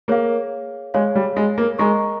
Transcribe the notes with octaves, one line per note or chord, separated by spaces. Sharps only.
A#3 G#4 C#5 F5
G#3 G#4 C#5 F5
G3
G#3
A#3
G#3 A#4 D#5 A#5 C#6